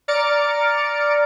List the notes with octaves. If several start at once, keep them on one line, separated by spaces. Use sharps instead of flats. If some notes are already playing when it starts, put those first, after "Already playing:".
D5 A#5 F6 A6 C#7 D7